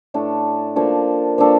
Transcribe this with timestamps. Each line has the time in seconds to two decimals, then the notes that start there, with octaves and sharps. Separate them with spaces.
0.14 A2 A3 D4 A4
0.76 F3 A#3 D4 A4
1.38 F3 A#3 D4 A4